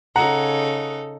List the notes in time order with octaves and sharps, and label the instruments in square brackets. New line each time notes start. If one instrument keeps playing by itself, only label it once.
[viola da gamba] C#3 D#4 A4 [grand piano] F#5 A#5